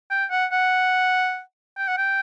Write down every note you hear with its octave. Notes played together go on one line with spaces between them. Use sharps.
G5
F#5
F#5
G5
F#5
G5